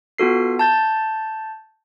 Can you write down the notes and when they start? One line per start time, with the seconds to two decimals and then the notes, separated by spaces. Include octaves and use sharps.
0.18 B3 F4 F#4 A4 C7
0.59 A5 G6 A6